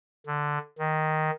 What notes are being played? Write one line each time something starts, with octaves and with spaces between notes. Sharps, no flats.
D3
D#3